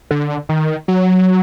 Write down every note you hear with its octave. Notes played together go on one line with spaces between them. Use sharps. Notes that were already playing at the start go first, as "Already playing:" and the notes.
D3
D#3
F#3